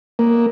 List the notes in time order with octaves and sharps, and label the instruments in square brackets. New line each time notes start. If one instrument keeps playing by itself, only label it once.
[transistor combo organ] A#3